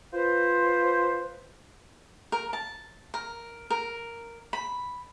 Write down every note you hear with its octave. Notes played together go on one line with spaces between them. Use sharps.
F4 B4 C5
A#4
A5
A#4
A#4
B5